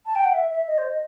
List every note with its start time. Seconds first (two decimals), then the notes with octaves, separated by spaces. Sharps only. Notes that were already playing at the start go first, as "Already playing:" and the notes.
0.05 A5
0.15 G5
0.25 F#5
0.33 E5
0.50 E5
0.67 D#5
0.78 C5
0.89 D#5